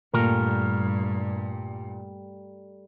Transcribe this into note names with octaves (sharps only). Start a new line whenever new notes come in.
G2 A#2 G3 A3 A#4